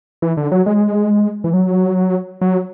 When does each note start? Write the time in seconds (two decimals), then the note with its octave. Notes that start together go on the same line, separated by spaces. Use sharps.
0.22 E3
0.37 D3
0.52 F#3
0.66 G#3
1.44 E3
1.53 F#3
2.41 F#3